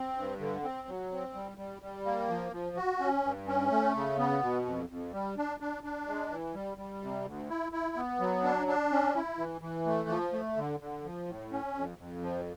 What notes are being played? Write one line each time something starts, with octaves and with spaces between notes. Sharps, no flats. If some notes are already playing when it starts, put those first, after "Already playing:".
Already playing: C4
G2
D3
C4
F#3
C4
G3
G3
G3
A#3
F3
F3
F#4
C#4
G2
C#4
A3
C#3
B3
B2
F2
F2
G3
D4
D4
D4
G#3
E3
G3
G3
C3
D2
E4
E4
B3
F#3
D4
D4
C#4
E4
E3
E3
A3
F3
A3
D3
D3
F3
A2
C#4
F2
F2
F3